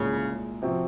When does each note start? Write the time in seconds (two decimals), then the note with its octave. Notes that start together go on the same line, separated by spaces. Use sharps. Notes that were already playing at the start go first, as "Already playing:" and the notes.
Already playing: C2 A#2 C#3 G#3
0.62 C3 F3 C4 F#4